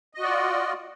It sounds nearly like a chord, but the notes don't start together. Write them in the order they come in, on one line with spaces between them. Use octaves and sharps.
D#5 F#4 D5 F4